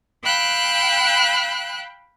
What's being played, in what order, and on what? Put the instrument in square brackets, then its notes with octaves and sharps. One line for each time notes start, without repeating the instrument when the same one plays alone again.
[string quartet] F5 G5 B5 E6 F#6